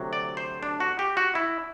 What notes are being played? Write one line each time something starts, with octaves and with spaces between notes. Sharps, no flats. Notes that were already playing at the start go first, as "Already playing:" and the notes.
Already playing: D2 C3 F#3
D5
C5
D4
F#4
G4
F#4
E4